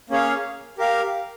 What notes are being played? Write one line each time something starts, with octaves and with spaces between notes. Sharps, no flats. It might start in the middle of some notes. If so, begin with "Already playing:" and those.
A#3 C#4 G#4 C#5 F5
G4 A#4 F5